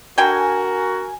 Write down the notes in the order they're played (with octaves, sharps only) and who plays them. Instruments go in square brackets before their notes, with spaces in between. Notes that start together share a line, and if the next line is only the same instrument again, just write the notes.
[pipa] D3 G5 [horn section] F#4 A#4 [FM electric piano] G#5